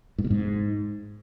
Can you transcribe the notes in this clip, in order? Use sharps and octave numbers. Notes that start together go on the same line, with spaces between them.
G#2
B2
G#2